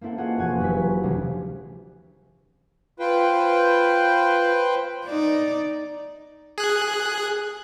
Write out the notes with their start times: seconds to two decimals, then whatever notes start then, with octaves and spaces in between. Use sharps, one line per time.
0.01 A#3 C4 E4 A4 F#5
0.18 A#3 F4 G#4 C#5 D#5 F#5
0.38 E1 F3 G#5 F#6 G#6
0.60 F1 F#3 E4 B6
1.03 D2 C3 E3 G3 A3 C#4
3.00 F4 B4 C5 G5
5.06 D#4 D5
6.58 G#4 F#6